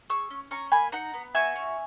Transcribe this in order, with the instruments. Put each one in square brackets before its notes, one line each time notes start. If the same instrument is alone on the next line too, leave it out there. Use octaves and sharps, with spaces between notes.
[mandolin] G#4 C#6 E6
C#4
C#4 A#5 C#6
A#3 G#5 B5
D#4 F#5 A#5
B3
F#4 E5 G#5
C#4